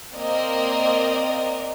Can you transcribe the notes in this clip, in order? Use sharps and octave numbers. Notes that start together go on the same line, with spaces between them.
A#3 C4 D5 D#5